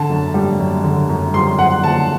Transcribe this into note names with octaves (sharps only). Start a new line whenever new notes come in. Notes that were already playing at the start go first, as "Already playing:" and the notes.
Already playing: D3 A5
F#2
G3
F#2
D3
F#2
G3 C6
F#2 F#5
D3 A5